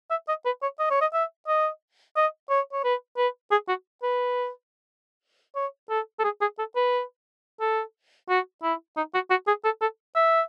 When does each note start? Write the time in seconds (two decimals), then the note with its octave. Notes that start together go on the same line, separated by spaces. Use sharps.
0.10 E5
0.28 D#5
0.45 B4
0.62 C#5
0.79 D#5
0.90 C#5
1.01 D#5
1.13 E5
1.48 D#5
2.16 D#5
2.50 C#5
2.73 C#5
2.84 B4
3.17 B4
3.51 G#4
3.68 F#4
4.03 B4
5.56 C#5
5.90 A4
6.19 A4
6.24 G#4
6.41 G#4
6.59 A4
6.76 B4
7.60 A4
8.29 F#4
8.63 E4
8.97 D#4
9.14 F#4
9.30 F#4
9.47 G#4
9.64 A4
9.81 A4
10.15 E5